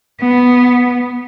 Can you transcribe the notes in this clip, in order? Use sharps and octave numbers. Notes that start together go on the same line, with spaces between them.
B3